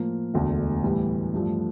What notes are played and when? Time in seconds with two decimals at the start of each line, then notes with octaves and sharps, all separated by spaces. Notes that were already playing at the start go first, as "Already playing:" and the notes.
Already playing: A2 F3 A#3
0.34 E1 D2 D3 A3
0.83 A2 E3 G3
1.34 G2 F3 A3